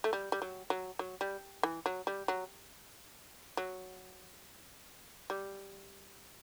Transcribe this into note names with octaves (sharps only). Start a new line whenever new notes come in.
A3
G3
G3
F#3
F#3
F#3
G3
E3
F#3
G3
F#3
F#3
G3